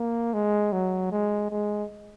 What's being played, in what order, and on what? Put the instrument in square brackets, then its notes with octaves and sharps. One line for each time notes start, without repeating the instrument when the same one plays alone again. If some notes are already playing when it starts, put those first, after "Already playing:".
Already playing: [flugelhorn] A#3
G#3
F#3
G#3
G#3